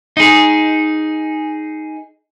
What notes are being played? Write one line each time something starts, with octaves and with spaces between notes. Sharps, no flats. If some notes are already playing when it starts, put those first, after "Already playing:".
D#4 G#4